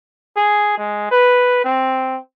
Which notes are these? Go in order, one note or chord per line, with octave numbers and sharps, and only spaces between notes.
G#4
G#3
B4
C4